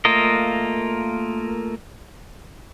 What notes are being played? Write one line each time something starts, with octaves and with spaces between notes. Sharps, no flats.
A3 A#3 F4 A#4 D#5